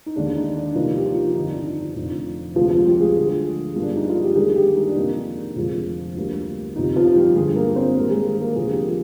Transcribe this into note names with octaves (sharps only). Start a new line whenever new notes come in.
D#4
D#2 D3 G#3 D4
D#4
D4
C2 C3 F3 A#3 D#4
G4
F3 F4
G1 F2 D#3 D#4
D4
D#4
F1 F2 D3
D2 C3 F3 G#3 F4
F3 F4
G3 G4
G#3 G#4
D2 D3 F3
G1 G2 F3 A#3
D4
D#4
F4
G4
D#2 D3 G3 G#3 A#3 G#4
G3 G4
D#4
D4
F2 C3 D#3 A#3 D#4
F1 F2 D3 F3 G#3
D2 D3 G3 A#3
G1 F2 C3 D#4
F3 F4
G3 G4
G1 G2 D3 G#3 G#4
A#3 A#4
C4 C5
G#1 G#2 G3 A#3 A#4
G#3 G#4
G#3 G#4
A#3 A#4
F1 F2 D3 F3 A#3 G#4
G4
F4